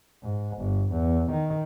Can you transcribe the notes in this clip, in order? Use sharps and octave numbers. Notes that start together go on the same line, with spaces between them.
G#2
G1
E2
D#3